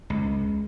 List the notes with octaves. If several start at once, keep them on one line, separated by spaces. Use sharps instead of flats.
C#2